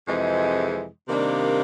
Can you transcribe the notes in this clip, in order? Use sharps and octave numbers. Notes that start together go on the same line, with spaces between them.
F2 C3 E3 G#3
C3 D#3 G3 A#3 D4